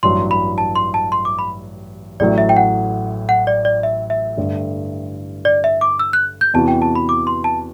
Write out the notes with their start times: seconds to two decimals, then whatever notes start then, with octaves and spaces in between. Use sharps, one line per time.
0.03 A1 G2 F#3 C6
0.31 B5
0.58 A5
0.75 C6
0.94 A5
1.12 C6
1.25 D6
1.39 B5
2.20 A1 A2 F#3 D5
2.38 E5
2.49 G5
2.57 F#5
3.29 F#5
3.47 D5
3.65 D5
3.83 E5
4.10 E5
4.37 G2 D3 A3
5.45 D5
5.64 E5
5.81 D6
5.99 E6
6.13 F#6
6.41 G6
6.54 E2 C3 E3 B3 F#4 A5
6.68 G5
6.82 A5
6.95 B5
7.09 D6
7.27 C6
7.44 A5